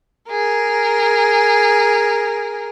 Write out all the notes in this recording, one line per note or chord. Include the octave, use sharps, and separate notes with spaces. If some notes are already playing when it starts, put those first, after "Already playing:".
G#4 A#4